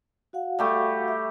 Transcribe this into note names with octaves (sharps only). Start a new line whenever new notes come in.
F#4 F5 F#5
G3 A3 G4
E5